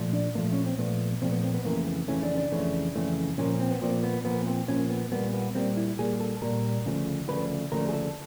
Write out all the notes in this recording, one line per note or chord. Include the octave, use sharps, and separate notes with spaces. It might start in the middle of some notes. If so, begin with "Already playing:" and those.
Already playing: A#2 F3 A3
D4
A#2 F3 A3 A#3
C#4
C4
A#2 F3 A3 B3
A#2 F3 A3 C4
B3
C4
B3
F2 C#3 E3 A3 A#3
B3
F2 C#3 E3 A3 C#4
D4
D4
F2 C#3 E3 A3
F2 C#3 E3 A3
A#2 F3 A#3 C#4
C4
B3
A#2 F3 A#3 C4
B3
A#2 F3 A#3 B3
C4
A#2 F3 A#3 C#4
B3
A#2 G3 A#3 B3
B3
A#2 G3 A#3 C4
E4
A#2 G3 A#3 G#4
A4
A#2 G3 A#3 A#4
D2 C#3 F3 A3
D2 C#3 F3 A3 B4
D2 C#3 F3 A3 A#4
G#4
A4